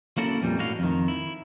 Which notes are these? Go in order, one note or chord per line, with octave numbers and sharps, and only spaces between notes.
A#3 C#4 E4 F#4 A4 A#4
F2 A#2 E3 G3
A2 E4 F#4 D#5 F5
F2 D#3
E4